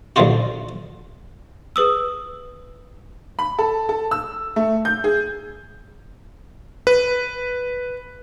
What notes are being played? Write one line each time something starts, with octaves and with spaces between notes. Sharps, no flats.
A#1 B2 D3 D#4 F4 F#4
G#4 B4 D#6 E6
B5
A4
A4
E6
A3
G6
G#4
B4